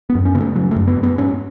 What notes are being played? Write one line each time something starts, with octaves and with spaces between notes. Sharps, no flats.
B3
F#2
C#4
C#3 B3
A3
C#3 F#3
A3
F#2
B3
F#2
B3
G#2 C#4